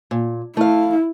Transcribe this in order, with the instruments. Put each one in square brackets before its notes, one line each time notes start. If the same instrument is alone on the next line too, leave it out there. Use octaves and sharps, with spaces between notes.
[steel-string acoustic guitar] A#2
[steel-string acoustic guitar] A3 F5 [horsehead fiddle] E4